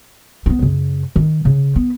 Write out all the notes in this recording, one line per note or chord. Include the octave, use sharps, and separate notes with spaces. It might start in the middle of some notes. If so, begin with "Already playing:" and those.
B3 D4
F#2 C#3
D#3
C#3
B3